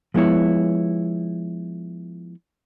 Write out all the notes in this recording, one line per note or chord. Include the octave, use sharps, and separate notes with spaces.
F3 G#3 B3 E4 C#5